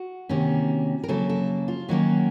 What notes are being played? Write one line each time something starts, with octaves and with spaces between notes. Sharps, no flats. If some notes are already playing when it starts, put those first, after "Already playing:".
Already playing: F#4
C3 D#3 A#3 C#4
A#4
C#3 F#3 A#3 A4
A4
F4
D#3 F#3 A#3 C#4 F#4